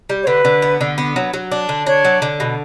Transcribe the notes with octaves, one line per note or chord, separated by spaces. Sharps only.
G3
C#5
D3 B4
D3
B3
D3
B3
F#3
F#3
D4
D3
D4 C#5
F#3
D3
B2